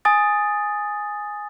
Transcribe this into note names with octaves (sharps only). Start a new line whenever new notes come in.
G#5 D#6 A6